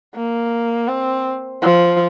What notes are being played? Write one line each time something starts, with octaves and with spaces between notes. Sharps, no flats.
A#3
C4
F3